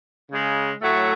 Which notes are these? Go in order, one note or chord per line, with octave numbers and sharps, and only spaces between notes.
C#3 G#3
A2 F#3 A3